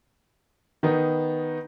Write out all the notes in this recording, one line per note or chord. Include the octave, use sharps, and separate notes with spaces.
D#3 B3 D#4